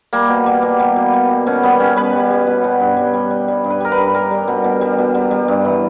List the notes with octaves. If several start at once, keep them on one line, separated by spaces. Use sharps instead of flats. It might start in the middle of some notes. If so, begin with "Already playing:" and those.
G3 A#3
B2
G3
B2
G3
B2
G3
B2
B2 C#4
G3 B3
G3 C#4
G3 B4
G3
G3
B2
B2
G2
G3
G3
G3
G3
G2
B4
G3 A#4
B4
G2
G3 A#4
G3
B2
B2
G3
B2
G3
G3
G2
E3